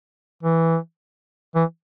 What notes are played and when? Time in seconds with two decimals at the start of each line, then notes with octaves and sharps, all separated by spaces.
0.43 E3
1.55 E3